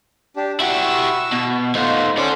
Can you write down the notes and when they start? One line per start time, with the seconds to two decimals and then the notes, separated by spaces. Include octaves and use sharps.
0.36 D4 G4
0.60 E4 F#4 G4 C#6 E6
1.32 B2
1.75 A3 D#4 F4 C5 F#5
2.18 C#4 A4 C5 D5 D6